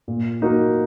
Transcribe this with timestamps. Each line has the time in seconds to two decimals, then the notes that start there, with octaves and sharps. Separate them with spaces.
0.08 A#2
0.42 A#3 D#4 F#4 A#4